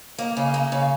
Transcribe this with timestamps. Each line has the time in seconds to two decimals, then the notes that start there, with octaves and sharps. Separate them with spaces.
0.18 A#3
0.37 C#3
0.54 A#3
0.72 C#3